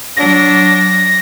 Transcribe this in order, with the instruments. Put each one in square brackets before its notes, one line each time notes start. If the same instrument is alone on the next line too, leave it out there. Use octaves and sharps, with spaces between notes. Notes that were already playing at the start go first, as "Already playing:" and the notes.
[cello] F#3 D4 [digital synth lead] A#6